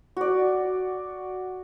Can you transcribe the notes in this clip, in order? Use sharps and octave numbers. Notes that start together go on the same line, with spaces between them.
F#4 D5